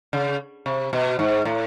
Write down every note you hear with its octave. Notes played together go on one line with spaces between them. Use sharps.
C#3
C3
B2
G#2
A2